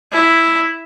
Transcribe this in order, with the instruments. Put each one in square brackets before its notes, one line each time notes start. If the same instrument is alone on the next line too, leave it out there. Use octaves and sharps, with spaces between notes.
[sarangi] E4